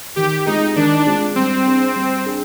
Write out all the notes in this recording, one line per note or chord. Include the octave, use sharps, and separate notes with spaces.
D#3 G4
G#3 C4 D#4 F4 G#4
D#3 D4
G#3 C4 F4 G#4
G3 C4
D4 G#4
G3
D4 G#4